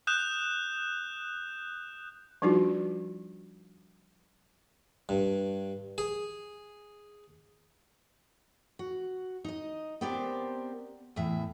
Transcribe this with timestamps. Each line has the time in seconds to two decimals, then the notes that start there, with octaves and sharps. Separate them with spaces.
0.07 D#6 F#6 G6 E7
2.42 F3 G3 D4 D#4 F4 F#4
5.09 G2
5.98 G#4
8.79 F#4
9.44 D#4 D#5
10.01 B3 C4 G4 A#4 C5 D5
11.16 E2 A2 E5